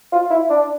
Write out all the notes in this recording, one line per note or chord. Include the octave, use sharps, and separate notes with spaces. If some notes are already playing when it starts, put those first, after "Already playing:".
F4
E4
D4